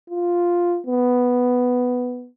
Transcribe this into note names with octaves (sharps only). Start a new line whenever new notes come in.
F4
B3